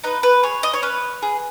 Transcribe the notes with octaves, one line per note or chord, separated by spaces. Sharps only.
D#4 B4
B4
G#4 C#5
D#5
C#5
C#4 B4
G#4